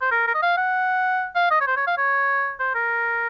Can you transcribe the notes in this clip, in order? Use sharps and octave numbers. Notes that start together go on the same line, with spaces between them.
C5
A#4
A#4
D#5
F5
F#5
F5
D#5
C#5
C5
C#5
F5
C#5
C5
A#4